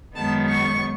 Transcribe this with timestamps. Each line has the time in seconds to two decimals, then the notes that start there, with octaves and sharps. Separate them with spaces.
0.15 F#2 D#3 G#3 B3 A5
0.49 C#6